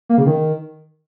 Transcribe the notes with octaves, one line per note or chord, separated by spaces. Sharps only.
A#3
C#3
D#3